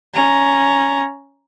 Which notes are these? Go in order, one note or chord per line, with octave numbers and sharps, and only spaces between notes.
C#4 A#5